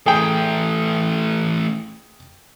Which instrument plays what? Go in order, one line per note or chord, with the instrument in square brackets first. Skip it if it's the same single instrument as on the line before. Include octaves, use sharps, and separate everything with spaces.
[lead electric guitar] E3 A3 [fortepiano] G#4 G5